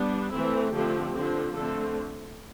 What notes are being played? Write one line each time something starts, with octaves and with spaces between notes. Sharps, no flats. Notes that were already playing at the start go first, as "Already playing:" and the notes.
Already playing: G3 B3 D4
E3 A3 C4 E4
D3 F3 A3 C4 G4
D3 F3 C4
D3 A3 C4 A4